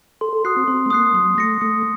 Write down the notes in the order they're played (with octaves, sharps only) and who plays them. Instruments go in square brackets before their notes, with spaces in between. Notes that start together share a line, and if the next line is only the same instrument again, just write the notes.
[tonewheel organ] A4 [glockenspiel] C6
[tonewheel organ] A4
[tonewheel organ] F#4 [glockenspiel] D#6 F#6 C7
[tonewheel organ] C4
[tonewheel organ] C4 [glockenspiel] C6
[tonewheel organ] A3
[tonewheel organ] A#3 [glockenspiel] D#6 F#6 C7
[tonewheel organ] F#3 [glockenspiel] D#6
[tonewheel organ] A3 [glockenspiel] A#6 C#7
[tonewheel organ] A3 [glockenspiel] D#6